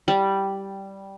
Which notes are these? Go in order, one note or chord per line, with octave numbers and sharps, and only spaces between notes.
G3